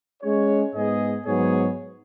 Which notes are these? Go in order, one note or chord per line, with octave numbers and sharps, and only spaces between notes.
G#3 C#4 G#4 C#5
G#2 G#3 B3 G#4 D#5
G#2 F#3 B3 G#4 C#5